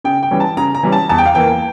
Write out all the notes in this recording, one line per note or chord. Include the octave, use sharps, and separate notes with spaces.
C#3 G5
G5
E3 G3 C#4
A5
C#3 A#5
A#5
E3 G3 C#4
A5
E2 A5
G5
F5
E3 A#3 G5